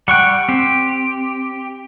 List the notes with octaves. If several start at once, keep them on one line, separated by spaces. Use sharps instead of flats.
G3 F#5 G5 C#6 F#6
C4 G4